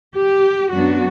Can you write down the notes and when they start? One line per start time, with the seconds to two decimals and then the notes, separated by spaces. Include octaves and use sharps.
0.17 G4
0.72 F#2 F#3 B3 D4 F#4